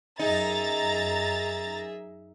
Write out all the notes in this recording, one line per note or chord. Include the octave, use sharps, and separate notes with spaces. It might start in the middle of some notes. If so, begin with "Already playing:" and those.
F#2 D#4 G#4 E5 A#5 A6